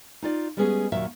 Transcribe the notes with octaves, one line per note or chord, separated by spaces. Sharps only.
D#4 F4 D5
G3 G#3 B3 C#4 G#4
D#2 A#2 F#3 E5